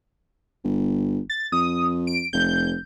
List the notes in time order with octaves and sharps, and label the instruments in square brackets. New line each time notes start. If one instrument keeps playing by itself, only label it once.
[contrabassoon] G1
[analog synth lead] A6
[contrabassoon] F2 [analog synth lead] D#6
[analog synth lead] D7
[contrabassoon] F1 [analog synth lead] G6